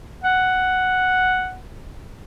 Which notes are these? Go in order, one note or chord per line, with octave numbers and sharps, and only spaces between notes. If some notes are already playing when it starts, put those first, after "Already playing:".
F#5